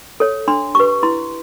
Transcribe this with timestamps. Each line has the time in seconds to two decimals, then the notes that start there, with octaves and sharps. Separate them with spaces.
0.20 A4 C#5
0.48 D4 C6
0.75 G4 B4 C#6
1.03 E4 C6